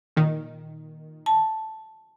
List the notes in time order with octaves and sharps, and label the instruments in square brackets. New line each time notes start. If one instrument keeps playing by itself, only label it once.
[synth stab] A#2 D#3
[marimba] A5